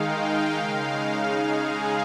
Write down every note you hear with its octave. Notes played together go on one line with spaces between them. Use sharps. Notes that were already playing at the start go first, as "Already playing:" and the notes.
Already playing: D#3 G#3 D#4 F5 G5
C#3 G#3 D#4 F5
G#4